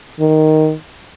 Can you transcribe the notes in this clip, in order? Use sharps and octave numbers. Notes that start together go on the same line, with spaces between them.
D#3